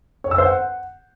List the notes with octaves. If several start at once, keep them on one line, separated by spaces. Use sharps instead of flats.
C#5
E6
C5
F#5